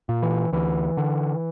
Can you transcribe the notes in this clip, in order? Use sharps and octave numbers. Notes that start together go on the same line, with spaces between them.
A#2
E3
D2 E3
D3